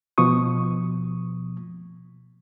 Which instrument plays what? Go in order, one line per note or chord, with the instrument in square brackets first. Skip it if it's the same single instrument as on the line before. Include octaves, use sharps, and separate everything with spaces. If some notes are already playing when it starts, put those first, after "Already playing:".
[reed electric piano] B2 F3 C#6 D#6